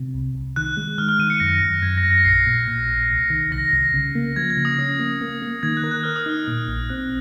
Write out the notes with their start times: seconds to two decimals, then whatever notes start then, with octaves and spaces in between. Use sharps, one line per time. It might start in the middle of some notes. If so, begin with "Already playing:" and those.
Already playing: C3
0.14 C2
0.35 C2
0.56 D#3 F#6
0.77 G#3
0.98 D#3 F6
1.09 F6
1.19 D#3 D#7
1.30 C#7
1.40 F#2 A#6
1.62 F#2
1.82 F#2 G#6
1.97 A#6
2.04 F#2
2.10 A#6
2.25 A#1 C7
2.46 A#2
2.68 A#2
2.88 A#1
3.10 C2
3.30 D#3
3.51 C2 A#6
3.73 C2
3.94 C#3
4.15 A#3
4.36 F3 G#6
4.50 G#6
4.57 C#3
4.65 D#6
4.79 C#4
4.99 A#3
5.21 A#3
5.42 A#3
5.63 D#3 G#6
5.77 F#6
5.84 A#4
5.91 F#6
6.03 A#4 F6
6.16 D#6
6.26 D#4 F6
6.48 A#2
6.68 A#1
6.89 C4 F#6